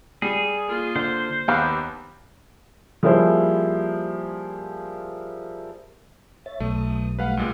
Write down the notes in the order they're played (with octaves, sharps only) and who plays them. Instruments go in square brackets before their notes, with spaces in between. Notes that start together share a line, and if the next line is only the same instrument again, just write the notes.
[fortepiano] G3 [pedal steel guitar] G#4
[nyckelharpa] A#3 F4
[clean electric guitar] D3 [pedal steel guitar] C5
[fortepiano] D#2 F5 [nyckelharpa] B3 [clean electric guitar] D#4 G4 B4
[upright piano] F3 G3 A#3 E4 G#4 C5
[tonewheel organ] C#5 E5 A6
[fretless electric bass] B1 [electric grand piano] A3 [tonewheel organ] D#6
[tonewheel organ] G3 A3 [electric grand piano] B4 F5 F#5
[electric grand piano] C#2 A#2 G#3